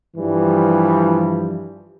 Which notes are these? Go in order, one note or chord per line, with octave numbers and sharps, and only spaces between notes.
G2 E3 F3 G3